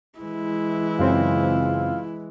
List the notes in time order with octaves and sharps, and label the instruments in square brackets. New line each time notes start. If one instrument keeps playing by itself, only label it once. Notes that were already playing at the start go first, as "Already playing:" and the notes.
[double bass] E3 G#3 [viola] E4
[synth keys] F#2 C#3 C4 [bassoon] F4